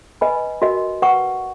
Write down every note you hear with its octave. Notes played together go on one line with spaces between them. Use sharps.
B4 D#5 G#5 B5
F#4 A#4 D#5
B4 F#5 C#6